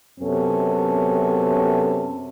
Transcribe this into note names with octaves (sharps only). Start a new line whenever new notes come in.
F#2 C3 B3 C#4 A4